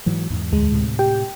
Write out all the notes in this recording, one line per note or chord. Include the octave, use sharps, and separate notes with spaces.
G#2 E3 F#3
E2 G#2
D2 G#3
A2 C3
G4 G5